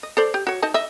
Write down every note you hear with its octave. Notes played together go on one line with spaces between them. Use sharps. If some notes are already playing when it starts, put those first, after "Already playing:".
D#5
A4 C5 D5
G4
F#4 C#5
D#4 D#5 A5
D#5 E5